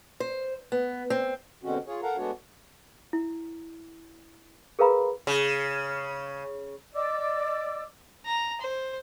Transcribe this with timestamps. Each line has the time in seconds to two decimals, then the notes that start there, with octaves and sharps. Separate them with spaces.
0.20 C5
0.72 B3
1.10 C4
1.64 B2 D3 G#3 C4 C#4 F#4
1.87 F4 G#4 C#5
2.03 A4 A#4 F5 F#5 A#5
2.17 G#3 A3 B3 D4 F#4 C#5
3.13 E4
4.79 G#4 A#4 B4 F5 A#5 B5
5.27 C#3
6.94 D5 D#5 D6 E6
8.26 A#5
8.61 C5